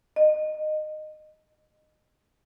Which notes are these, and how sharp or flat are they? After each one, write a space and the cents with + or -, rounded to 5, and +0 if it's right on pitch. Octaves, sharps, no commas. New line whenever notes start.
D#5 -20